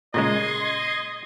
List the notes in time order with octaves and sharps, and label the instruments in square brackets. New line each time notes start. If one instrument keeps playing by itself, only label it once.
[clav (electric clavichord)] A#2 C#3 G#3 [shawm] D#5 [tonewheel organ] C6 G#6